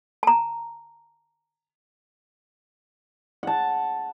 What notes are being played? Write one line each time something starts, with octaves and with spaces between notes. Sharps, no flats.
A5 A#5
F#5 A5